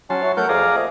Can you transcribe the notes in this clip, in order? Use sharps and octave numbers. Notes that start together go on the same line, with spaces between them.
F#3 C#4 A5 C6
E4 F#4 C#5
F#3 A3 A#4 F#5 G6
F2 G#4 D5 F5 A#5
A#2 A3 C4 D#5